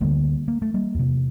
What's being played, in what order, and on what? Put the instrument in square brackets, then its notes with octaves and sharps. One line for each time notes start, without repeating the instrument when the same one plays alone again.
[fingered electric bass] D2 D3 G3 A#3
A#3
A3
G3 A#3
E2 C3